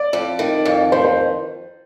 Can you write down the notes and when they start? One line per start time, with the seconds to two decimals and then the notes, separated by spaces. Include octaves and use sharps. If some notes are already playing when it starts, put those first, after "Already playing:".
Already playing: D5
0.13 F2
0.39 D#3
0.65 F2
0.92 D#3 C5
1.05 C5